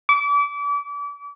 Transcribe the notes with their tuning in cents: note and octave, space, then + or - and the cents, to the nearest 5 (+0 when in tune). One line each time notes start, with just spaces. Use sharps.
D6 -35